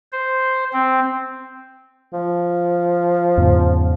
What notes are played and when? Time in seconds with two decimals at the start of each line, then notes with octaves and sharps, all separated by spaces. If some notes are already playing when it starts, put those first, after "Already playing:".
0.12 C5
0.73 C4
2.13 F3
3.37 E2 G#2 C#3